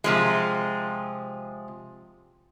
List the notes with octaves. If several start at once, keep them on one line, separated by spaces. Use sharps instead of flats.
C3 F3 G#3